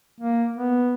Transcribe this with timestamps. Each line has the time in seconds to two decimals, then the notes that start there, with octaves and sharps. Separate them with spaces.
0.20 A#3
0.56 B3